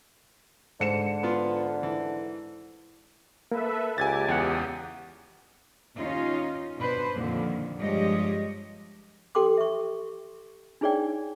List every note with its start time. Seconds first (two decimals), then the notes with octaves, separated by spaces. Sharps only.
0.80 G#2 D3 C#7 E7
1.23 B3 F4
1.83 E3
3.52 A#3 A4 B4 E5
3.98 C#2 G4 G#5 D6 G#6 A6
4.28 E2 G4 F#5 G#5 D#6
5.97 D#2 C#4 D#4 F4 D#5
6.78 B2 D4 B4 C5
7.13 F2 A#2 D3 D#3 F3
7.79 G2 F3 G#3 G4 C#5 D#5
9.35 G4 A4 G5 C6 D6
9.58 E5 C#6
10.81 D4 D#4 G#4 C#5 D5 G5